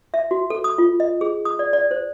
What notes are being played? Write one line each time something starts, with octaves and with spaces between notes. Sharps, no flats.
E5
F#4
A4
D#6
F4
D#5
G#4
D#6
D5
D5
C5